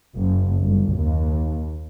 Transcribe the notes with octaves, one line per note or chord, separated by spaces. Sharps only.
F#1
G1
D#2